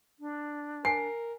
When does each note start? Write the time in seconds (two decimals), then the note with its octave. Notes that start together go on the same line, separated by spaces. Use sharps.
0.20 D4
0.85 A#4 G#5 C7